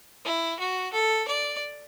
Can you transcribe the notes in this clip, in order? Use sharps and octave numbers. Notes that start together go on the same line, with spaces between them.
E4
F#4
A4
D5